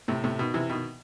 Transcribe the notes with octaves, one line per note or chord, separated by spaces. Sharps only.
A2 C3
A2 C3
B2 D#3
C3 E3
B2 D#3